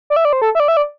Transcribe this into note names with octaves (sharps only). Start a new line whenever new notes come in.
D5
E5
D5
C5
A4
E5
D5
E5
D5